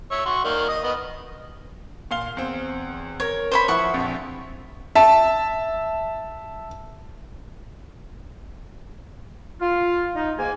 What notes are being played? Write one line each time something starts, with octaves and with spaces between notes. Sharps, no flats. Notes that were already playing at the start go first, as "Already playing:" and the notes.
C#5 E5
F#4 C6 C#6
D#3 A#3 D5
D#5 D#6
B3 D#5
A#2 F5 G7
E2 C4
A#4 C#5 G#6
C5 C#5 B5
F3 E4 F#5 C#6
A#1 F2
E5 A5
F4
D#4
G#2 A#3 G#5